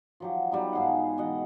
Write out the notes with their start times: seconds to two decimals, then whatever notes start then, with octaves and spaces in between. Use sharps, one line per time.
0.20 F3 F#3 G4
0.52 F#3 G3 B3 D#4
0.73 G#2 G#4 F5 F#5
1.18 B2 E3 D#5 F#5